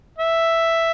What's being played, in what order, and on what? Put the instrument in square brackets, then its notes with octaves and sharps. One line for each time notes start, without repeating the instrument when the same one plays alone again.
[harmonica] E5